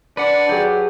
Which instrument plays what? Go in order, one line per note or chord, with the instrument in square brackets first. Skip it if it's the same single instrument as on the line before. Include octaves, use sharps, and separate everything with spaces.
[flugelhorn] D4 [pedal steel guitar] B4 F#5 [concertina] D5
[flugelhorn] F#3 [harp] G4 G#4